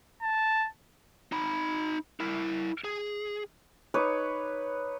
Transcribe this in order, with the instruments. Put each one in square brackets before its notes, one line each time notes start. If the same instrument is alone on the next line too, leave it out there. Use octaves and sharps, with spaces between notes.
[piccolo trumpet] A5
[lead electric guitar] D#4 B5
E4 A#4
G#4
[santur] D#4 B4 C#5 D6